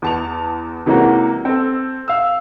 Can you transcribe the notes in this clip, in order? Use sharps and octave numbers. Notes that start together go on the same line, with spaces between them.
E2 A5 F7
C3 E3 G#3 A#3 C#4 F#4
C4 A4
F5 E6